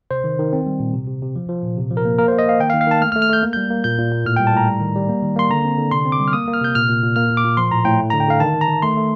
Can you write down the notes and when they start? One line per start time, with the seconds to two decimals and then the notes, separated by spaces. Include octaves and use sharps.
0.11 C3 C5
0.24 D#3
0.39 D#3
0.53 C4
0.67 G3
0.80 A#2
0.93 C3
1.07 C3
1.22 C3
1.36 F3
1.49 F3
1.63 A#2
1.77 C3
1.91 F3
1.97 A#4
2.05 A#3
2.18 A#3 A#4
2.28 C5
2.32 A#3
2.38 D#5
2.46 A#3 F5
2.60 D#3 G5
2.70 F5
2.74 D#3
2.81 F5
2.87 D#3 A5
3.01 A3 F6
3.12 F6
3.16 A3
3.22 F6
3.29 A3 G6
3.43 A#3
3.53 G3 G6
3.70 A#3
3.84 A#2 G6
3.98 A#2
4.12 A#2
4.25 A2 F6
4.36 G5
4.40 G3
4.47 A5
4.54 A2 A#5
4.67 G3
4.81 D#3
4.95 G3
5.09 A#3
5.23 D#3
5.36 A#3 C6
5.50 D3 A#5
5.65 C4
5.78 D3
5.91 C3 C6
6.05 C4
6.12 D6
6.20 G3
6.28 F6
6.33 A#3 D#6
6.48 A#3
6.53 F6
6.61 C3 G6
6.75 A#2 F6
6.89 A#2
7.03 A#2
7.16 A#3 F6
7.30 A#2
7.37 D6
7.45 A#2
7.57 F3 C6
7.71 A2 A#5
7.85 A2 G5
7.99 A3
8.10 A#5
8.13 D3
8.20 G5
8.28 D3 F5
8.40 D#3 A5
8.54 D#3
8.61 A#5
8.69 D#3
8.82 A3 C6
8.97 A3